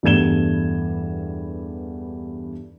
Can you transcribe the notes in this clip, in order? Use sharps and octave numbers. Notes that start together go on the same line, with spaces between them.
E2 G2 A3 G#6 E7 G7